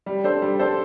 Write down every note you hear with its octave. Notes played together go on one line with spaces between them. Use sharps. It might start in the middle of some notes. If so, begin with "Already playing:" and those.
G3
D4 A4 C5
G3
D4 A4 C5